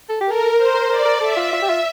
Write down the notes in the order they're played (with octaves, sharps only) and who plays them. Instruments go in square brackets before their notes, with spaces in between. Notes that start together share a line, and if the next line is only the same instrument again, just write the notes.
[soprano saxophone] A4
[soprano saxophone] G4 [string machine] A#4
[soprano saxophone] A4
[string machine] C5
[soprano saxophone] A#4
[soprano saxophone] A#4 [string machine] D5
[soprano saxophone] A#4
[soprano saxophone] A4 [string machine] E5
[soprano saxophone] F4
F4
G4
F4